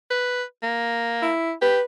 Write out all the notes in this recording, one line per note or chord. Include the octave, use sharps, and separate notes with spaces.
B4
A#3
E4
G4 B4